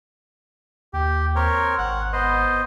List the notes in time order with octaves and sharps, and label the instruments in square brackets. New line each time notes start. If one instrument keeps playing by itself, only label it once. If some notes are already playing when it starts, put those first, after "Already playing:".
[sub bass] D#2 [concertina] G4
[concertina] C4 A#4 C#5
[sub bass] G#1 [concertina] F#5
[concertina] B3 C5 D#5